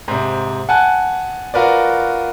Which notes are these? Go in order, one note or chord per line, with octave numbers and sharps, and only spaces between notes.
G#2 C3
F#5 G#5 A5 F#6
F4 F#4 A#4 B4 D5